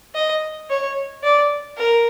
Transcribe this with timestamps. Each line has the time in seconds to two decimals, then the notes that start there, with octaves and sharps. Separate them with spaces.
0.15 D#5
0.70 C#5
1.23 D5
1.78 A#4